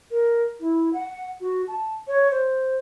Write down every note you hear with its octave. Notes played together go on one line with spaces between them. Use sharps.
A#4
E4
F#5
F#4
A5
C#5
C5